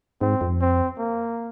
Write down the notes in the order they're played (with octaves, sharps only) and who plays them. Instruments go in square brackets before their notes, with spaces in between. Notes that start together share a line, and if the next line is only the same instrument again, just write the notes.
[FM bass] G#2 [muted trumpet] C4
[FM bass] F2
[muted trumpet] C4
A#3